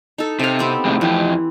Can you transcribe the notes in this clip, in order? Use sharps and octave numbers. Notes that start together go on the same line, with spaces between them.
D#4 A4
C3 A4 F5
B3 C4 G4
A2 C3 G#3
F2 E3 G4